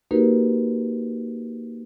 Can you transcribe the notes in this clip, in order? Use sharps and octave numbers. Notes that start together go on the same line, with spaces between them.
A#3 D#4 F#4 G4 A#4 B4